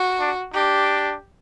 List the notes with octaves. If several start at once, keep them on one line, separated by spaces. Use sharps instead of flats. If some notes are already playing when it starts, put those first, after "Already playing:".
Already playing: F#4
D4
D4 G4